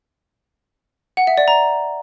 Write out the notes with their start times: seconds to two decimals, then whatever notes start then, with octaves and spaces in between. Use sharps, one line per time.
1.17 F#5
1.27 E5
1.37 D5
1.48 A#5